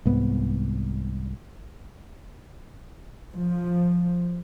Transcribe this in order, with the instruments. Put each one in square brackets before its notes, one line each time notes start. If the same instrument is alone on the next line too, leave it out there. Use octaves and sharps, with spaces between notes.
[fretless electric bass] C2 G#2 B3
[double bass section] F3